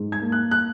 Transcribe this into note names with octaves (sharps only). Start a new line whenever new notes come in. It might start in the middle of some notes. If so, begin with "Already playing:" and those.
Already playing: G#2
G#6
A#3
F#6
F#6